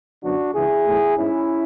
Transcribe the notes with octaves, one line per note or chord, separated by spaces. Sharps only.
F#2 D3 F#3 B3 D4 F#4
C#2 C#3 E3 E4 G#4
B1 A2 E3 A3
G#2 G#3 B3 C#4 E4